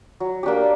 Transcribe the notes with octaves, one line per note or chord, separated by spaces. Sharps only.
F#3
A#3 D4 G4